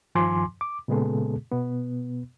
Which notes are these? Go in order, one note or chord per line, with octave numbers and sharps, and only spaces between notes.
G2 D#3 F3 G#5 C6 D6
D6
A#2 C#3 G#3 B3 G#4 A4
B2 B3